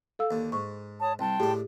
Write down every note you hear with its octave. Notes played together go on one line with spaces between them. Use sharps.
A4 F5 E6
D#2 D3
G#2 C#6
C#5 A5 D#6
C2 G5 A5 C6
A2 D4 G4 G#4